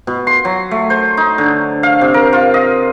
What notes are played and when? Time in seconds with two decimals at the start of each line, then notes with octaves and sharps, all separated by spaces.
0.07 B2
0.27 C6
0.45 F#3
0.71 A3
0.90 C5
1.17 D#4
1.38 D3
1.83 F5
2.01 C3
2.14 A#4
2.33 F4
2.54 D#5